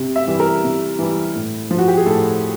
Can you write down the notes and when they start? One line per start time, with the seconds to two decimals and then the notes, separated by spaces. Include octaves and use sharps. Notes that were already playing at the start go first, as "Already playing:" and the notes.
Already playing: C3
0.16 E5
0.28 E3 G3
0.40 A#4
0.64 C3
0.99 E3 G3
1.35 A2
1.71 F3
1.78 F#4
1.88 G4
1.97 G#4
2.06 A2 A4